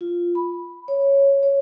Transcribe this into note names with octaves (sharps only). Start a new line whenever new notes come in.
F4
B5
C#5
C#5